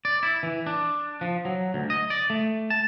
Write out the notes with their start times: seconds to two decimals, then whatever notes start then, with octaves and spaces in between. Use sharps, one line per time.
0.05 D5
0.23 E4
0.43 E3
0.66 D4
1.21 F3
1.45 F#3
1.74 D2
1.90 D#5
2.10 D5
2.30 A3
2.70 A5